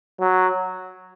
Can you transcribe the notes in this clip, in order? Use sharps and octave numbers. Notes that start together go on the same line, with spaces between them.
F#3